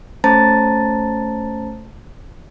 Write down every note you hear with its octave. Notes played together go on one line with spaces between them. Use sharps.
A3 C#4 C5 A5 A#5 A6